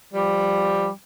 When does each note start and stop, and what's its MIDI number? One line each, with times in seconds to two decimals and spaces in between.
0.14 0.90 53
0.14 0.90 55